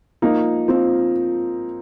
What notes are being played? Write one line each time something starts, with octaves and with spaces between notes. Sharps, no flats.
F3 A#3 D#4
F3 C4